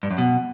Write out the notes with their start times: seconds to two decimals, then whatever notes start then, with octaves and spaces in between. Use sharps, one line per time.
0.03 G2
0.11 F#2
0.18 B2